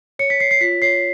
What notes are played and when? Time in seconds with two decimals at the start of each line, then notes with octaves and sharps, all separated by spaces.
0.19 C#5 C#7
0.30 B6
0.40 C#5 C7
0.51 C7
0.61 F4 B6
0.82 C#5 C7